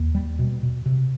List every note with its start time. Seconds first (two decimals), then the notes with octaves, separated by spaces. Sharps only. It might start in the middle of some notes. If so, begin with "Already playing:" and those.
Already playing: D#2
0.15 G3
0.39 B2
0.63 B2
0.86 C3